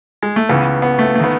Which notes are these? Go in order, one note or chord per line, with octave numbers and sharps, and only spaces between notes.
G#3
A3
C#2 C#3 E3 B3
B3
A3
A3
D#3 B3